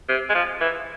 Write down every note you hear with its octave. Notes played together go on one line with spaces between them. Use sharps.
C3
G#3
F3
E3